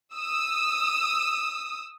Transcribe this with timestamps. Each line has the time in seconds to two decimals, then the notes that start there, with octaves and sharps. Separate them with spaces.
0.15 D#6 E6